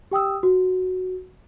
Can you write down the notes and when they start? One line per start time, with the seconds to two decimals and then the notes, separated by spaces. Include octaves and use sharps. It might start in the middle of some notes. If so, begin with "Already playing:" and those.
0.11 G4 G5 D#6 E6
0.43 F#4